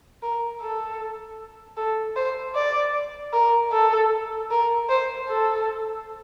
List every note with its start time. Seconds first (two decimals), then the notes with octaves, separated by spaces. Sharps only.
0.22 A#4
0.61 A4
1.77 A4
2.16 C5
2.55 D5
3.33 A#4
3.72 A4
4.51 A#4
4.89 C5
5.28 A4